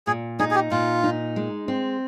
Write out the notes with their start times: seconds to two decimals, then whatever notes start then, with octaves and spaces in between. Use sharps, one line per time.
0.07 A#2 G#4
0.39 D#4 G#4
0.51 G#4
0.55 G4
0.71 A#2 F4
1.04 D#4
1.36 G#3
1.68 C4